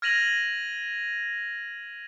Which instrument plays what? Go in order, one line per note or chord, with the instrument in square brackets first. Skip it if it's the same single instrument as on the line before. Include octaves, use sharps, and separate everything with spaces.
[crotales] F6 G#6 A#6 D#7 F7 F#7